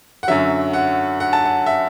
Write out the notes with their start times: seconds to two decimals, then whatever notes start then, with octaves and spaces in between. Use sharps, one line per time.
0.23 F#5
0.28 F#2 D3 F#3 E5
0.73 F#5
1.20 F#5
1.33 A5
1.45 F#5
1.66 E5